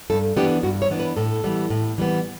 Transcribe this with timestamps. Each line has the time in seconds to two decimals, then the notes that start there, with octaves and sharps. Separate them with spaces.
0.10 G2 A4
0.37 E3 B3 D4 G4
0.63 G2 F#4
0.82 C#5
0.90 E3 B3 D4
0.99 B4
1.16 A2 A4
1.44 E3 G3 B3
1.70 A2
1.98 E3 G3 B3